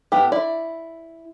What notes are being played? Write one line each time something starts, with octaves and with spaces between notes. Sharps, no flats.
A2 B3 G4
E4 D5